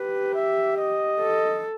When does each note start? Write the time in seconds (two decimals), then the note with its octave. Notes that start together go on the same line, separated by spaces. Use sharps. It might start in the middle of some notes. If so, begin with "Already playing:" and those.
Already playing: G4 B4
0.34 E5
0.77 D#5
1.19 A4